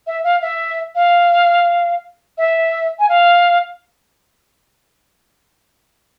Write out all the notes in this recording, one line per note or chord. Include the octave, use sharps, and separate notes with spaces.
E5
F5
E5
F5
E5
G#5
F5